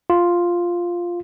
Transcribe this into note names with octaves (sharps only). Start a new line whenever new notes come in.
F4